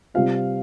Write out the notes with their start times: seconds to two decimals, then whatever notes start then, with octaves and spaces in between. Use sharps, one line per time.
0.14 C3 G3 C4 F4 F5